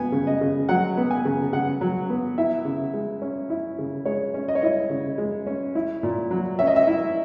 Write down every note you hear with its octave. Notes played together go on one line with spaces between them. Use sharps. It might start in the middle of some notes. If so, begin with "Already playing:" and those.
Already playing: B3 G#5
C#3
D#5
C#3
F#3 F#5
B3
G#5
C#3
C#3 F#5
F#3
B3
E4 E5
C#3
G#3
C#4
E4
C#3
G#3 C#5
C#4
D#5
C#5
E4 D#5
C#3
G#3
C#4
E4
A#2
F#3
C#4 E5
D#5
E5
E4